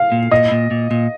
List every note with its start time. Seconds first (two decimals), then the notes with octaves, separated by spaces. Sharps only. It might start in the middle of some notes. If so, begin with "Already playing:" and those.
Already playing: F5
0.12 A#2
0.31 A#2 D#5
0.51 A#2
0.71 A#2
0.91 A#2